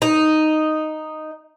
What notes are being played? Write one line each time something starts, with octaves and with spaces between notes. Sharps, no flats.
D#4